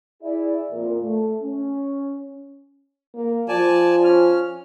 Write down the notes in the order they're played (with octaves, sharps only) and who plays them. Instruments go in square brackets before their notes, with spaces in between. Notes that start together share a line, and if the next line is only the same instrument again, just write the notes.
[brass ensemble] E4 G#4 D5 E5
F2 A#2 A#4
A3
C#4
[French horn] A#3
[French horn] F3 [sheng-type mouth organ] D5 G#5 A5
[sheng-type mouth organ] C#4 F6